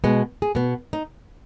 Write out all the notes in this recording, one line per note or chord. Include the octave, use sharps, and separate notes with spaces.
B2 G#3 B3
G#4
B2 B3
D#4